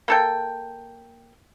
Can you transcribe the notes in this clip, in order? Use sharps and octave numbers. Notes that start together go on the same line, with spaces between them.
A#3 A4 G5